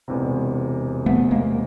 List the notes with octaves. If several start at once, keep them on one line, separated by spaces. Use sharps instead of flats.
E1 E2 C3
A3 B3
G#3 A#3